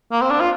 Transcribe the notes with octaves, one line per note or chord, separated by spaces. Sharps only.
A#3
C4
D4
F4